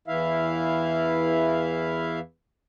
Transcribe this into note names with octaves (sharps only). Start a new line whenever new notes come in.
E2 E3 E4 E5 F5